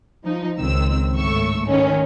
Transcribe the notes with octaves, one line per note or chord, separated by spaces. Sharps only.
F3 D#4
C#2 D#3 C4 E6
G#1 A2 A3 C#6 E6
D#3 A3 C#4